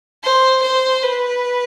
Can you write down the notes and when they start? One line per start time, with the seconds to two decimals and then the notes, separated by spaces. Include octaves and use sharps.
0.23 C5
0.63 C5
1.03 B4